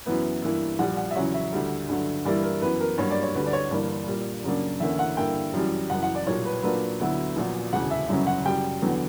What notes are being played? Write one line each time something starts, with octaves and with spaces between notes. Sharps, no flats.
F#2 E3 B3 E4 B4
G2 E3 A#3 E4
A#1 A#2 G3 F#5
F#5
E5
E2 C#3 F#3 C#4 F#5
E5
D2 D3 G3
G2 D3 F#3
G2 E3 G3 A#3 E4 D5
A#4
F#2 E3 B3 B4
A#4
G2 F#3 A#3 C#5
D5
C#5
D2 D3 G3 B4
D5
C#5
G1 G2 E3 A#3 D4
A#2 G3 A#3
F#2 C#3 F#3 A#3 D4
E2 D3 A#3 C#4 E4 E5
F#5
G2 D3 A#3 E4 G5
F#2 E3 G3
F#1 F#2 E3 F#5
F#5
D5
B1 A#2 G3 A#3 C#5
B4
A#2 F#3 A#3 D4 B4
D2 D3 F#3 B3 E4
A#1 A#2 F#3 B3
E1 D2 C#3 E3 F#5
E5
G1 F#2 C#3 F#3 C#4 E5
F#5
F#2 C#3 G3 G5
E2 D3 F#3 B3